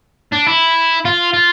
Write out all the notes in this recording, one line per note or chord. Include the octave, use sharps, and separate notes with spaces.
D4
E4
F4
F4